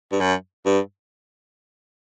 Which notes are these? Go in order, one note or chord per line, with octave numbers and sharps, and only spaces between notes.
G2
F#2
G2